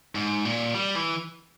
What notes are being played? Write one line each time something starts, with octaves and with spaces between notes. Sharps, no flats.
G#2
A#2
G3
E3